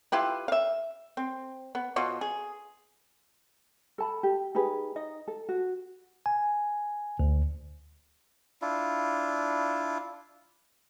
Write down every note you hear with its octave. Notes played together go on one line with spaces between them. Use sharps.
E4 F4 G4 B4
E5 F5
C4
B3
B2 F4 F#4
G#4
A4 A5 B5
G4
D#4 G4 G#4 B4
D#4 D#5
A4
F#4
G#5
D2
D4 E4 F4